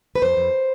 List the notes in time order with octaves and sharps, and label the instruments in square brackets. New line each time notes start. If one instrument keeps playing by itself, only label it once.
[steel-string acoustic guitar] B4
F2 C5
F2